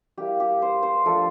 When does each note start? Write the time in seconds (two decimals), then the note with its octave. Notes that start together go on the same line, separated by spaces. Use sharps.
0.17 G3 A#3 E4 G4
0.40 G4
0.62 C5
0.83 C5
1.06 F3 A3 D4 F4 A4